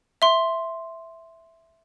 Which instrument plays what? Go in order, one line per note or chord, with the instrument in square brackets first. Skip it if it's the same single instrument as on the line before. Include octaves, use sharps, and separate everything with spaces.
[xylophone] E5 C6